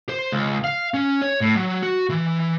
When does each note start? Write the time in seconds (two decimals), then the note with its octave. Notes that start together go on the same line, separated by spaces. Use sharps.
0.09 C5
0.32 C#2
0.64 F5
0.94 C#4
1.22 C#5
1.41 A2
1.55 F#3
1.82 F#4
2.09 E3